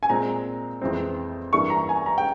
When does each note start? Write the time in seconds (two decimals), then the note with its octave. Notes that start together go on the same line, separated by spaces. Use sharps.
0.03 G#5
0.09 A#2 G#3 C4 A#5
0.81 F2 E3 G#3 C4
1.53 G2 E3 G3 A#3 C#6
1.70 A#5
1.89 G#5
2.06 A#5
2.18 G5